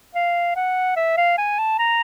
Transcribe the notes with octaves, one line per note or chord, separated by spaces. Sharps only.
F5
F#5
E5
F5
G#5
A5
A#5